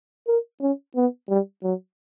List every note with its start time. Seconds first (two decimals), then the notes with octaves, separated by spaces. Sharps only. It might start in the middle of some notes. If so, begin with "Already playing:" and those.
0.28 A#4
0.61 C#4
0.96 B3
1.29 G3
1.63 F#3